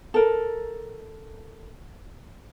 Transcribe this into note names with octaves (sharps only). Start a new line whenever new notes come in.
A4 A#4